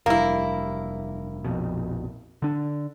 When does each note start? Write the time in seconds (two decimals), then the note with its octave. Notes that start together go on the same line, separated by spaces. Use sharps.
0.06 F1 G2 A#3 E4
1.45 A#1 F2 B2
2.42 D3 D4